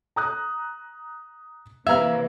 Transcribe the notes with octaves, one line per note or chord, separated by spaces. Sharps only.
A#5 D#6 F#6
C3 E3 A#3 B4 E5 F5 A#5 G#6